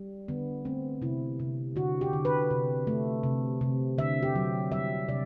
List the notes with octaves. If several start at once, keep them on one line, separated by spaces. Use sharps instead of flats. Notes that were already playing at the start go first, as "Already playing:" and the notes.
Already playing: G3
D3 B3
A3 C4
C3 E4
C3
D3 F#4
G4
D3
B4
C3
A3
C3
C3
D3 E5
G4
F#3
G3 E5
C3 D5